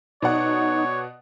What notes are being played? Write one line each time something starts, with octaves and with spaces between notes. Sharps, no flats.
B2 D#4 C#5 D5 F#5